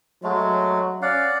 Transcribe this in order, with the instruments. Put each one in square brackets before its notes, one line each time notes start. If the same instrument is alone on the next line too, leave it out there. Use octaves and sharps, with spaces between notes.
[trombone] F#3 [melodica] G#3 A3
[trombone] C#4 [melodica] D5 F5 F#5